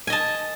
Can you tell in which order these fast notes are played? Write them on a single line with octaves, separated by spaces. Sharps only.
G#5 D#5 A5